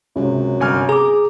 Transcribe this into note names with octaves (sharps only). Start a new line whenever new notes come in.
C#2 F#2 C3
G1 G#5 F6
G#4 A#5 D6